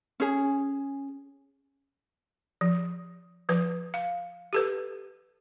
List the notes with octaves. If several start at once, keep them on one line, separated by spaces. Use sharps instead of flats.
C#4 G#4
F3
F3 B4
F5
G4 A4 B4